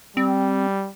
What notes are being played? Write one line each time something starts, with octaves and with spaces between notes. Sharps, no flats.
G3 C4